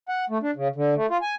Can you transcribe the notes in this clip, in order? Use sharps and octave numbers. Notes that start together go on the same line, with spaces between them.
F#5
A3
D4
C#3
D3
A3
F4
G#5